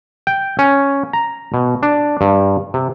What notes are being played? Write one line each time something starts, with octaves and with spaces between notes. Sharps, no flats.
G5
C#4
A#5
B2
D4
G2
C3